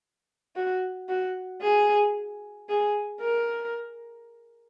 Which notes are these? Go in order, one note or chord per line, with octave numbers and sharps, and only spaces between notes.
F#4
F#4
G#4
G#4
A#4